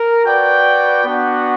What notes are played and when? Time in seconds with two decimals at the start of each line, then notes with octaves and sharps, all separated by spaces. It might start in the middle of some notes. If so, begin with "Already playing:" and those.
Already playing: A#4
0.24 F#4 B4 D5 G5
1.05 B3 D4 F#4